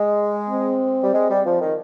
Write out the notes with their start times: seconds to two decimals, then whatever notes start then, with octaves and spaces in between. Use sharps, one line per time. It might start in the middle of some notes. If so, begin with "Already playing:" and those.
Already playing: G#3
0.50 C4
1.03 G3
1.13 G#3
1.29 G3
1.45 F3
1.61 D#3